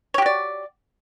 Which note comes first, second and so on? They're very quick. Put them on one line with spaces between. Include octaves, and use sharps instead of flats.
C#5 G4 F#4 D5